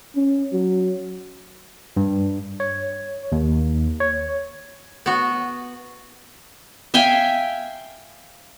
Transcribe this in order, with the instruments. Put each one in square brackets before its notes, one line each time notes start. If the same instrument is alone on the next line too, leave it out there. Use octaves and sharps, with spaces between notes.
[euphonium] C#4
F#3
[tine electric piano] G2
C#5
D#2
C#5
[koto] B3 F#4
[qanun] E5 F5 G5 G#5